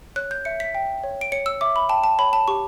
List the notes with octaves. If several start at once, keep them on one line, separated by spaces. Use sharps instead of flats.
C#5 F#6
G6
E5 C#7
B6
G5
C#5
D7
C#5 C#7
E6
E5 D6
B5
G5 A5
A5
C#5 B5
A5
G4 C#6